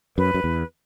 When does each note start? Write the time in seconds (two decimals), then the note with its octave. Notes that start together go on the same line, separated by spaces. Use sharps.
0.17 F#2 B4
0.34 F#2
0.44 E2